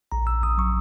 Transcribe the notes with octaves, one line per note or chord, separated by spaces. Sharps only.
A#1 A#5
A#1 E6
A#1 D#6
F#3 C#6